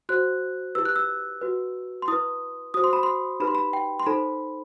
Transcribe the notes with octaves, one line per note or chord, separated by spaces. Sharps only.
F#4 C5 F#6
E4 G4 B4 E6
F#6
E6
F#4 B4
C6
E4 B4 D#6
F#4 C5 D#6
C6
B5
C6
D#4 G4 B4 B5
C6
B5
G5
C6
D#4 A4 C5 B5